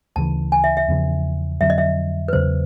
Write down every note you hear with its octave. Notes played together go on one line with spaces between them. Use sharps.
D2 C#3 E3 A5
G#5
E5
E5
E2 C#3 F3
F2 D3 F#3 E5
D#5
E5
B4
E2 C#3 F#3 C5